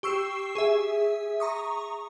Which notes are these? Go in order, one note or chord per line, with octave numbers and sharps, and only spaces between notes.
G4 C#6 E6 C7 E7
G#4 E5
A#5 C#6 D#6